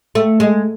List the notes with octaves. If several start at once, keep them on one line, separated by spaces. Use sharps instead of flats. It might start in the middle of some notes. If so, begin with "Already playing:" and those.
A3
G#3